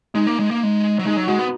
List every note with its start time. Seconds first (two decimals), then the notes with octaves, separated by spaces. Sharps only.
0.14 G#3 D#4
0.27 A#3
0.39 G#3
0.51 A#3
0.63 G#3
0.99 F#3
1.05 G#3 D#4
1.17 F#3
1.27 G#3 F#4
1.39 B3